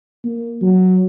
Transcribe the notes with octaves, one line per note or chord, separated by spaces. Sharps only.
A#3
F#3